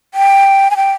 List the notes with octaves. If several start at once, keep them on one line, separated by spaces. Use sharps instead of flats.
G5
G#5
G5